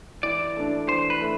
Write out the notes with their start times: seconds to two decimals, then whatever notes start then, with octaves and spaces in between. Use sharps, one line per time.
0.23 E3 D5
0.57 A3 D4
0.89 E3 C5
1.10 B4
1.20 A3